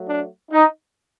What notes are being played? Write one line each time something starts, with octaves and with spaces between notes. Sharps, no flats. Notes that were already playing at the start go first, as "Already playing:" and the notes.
Already playing: F#3 A3
D4
D#4